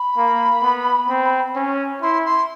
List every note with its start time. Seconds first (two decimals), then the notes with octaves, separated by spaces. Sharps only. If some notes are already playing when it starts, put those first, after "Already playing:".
Already playing: B5
0.17 A#3
0.63 B3
1.09 C4
1.56 C#4
2.02 E4 C6
2.25 C6